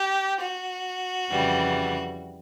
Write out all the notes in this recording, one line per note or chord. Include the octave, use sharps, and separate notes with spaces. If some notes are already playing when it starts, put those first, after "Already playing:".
Already playing: G4
F#4
F2 C#3 E3 G3